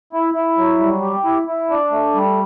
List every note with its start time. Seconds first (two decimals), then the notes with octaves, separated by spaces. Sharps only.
0.13 E4
0.34 E4
0.57 F#3
0.80 G3
1.02 G4
1.24 E4
1.47 E4
1.70 D4
1.92 A3
2.15 G3